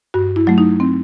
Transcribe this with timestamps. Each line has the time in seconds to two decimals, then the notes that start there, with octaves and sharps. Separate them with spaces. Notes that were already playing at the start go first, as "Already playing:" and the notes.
0.14 G2 F#4
0.36 E4
0.47 F#3 A3
0.58 D#4
0.80 C4